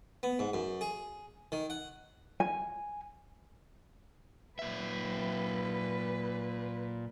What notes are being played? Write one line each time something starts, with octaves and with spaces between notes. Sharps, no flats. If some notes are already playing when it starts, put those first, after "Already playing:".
B3
G#2
F#2
G#4
D#3
F#5
G#5
A#2 F#3 B4 E5